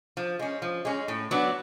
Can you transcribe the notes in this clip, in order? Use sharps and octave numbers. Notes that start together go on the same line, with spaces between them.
F3
G#3 C#4
F3
G#3 C#4
A2
F#3 B3 D4